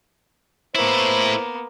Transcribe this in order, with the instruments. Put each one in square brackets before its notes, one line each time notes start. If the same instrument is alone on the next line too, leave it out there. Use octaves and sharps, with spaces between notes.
[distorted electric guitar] A2 E4 [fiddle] A#3 B3 [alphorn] C5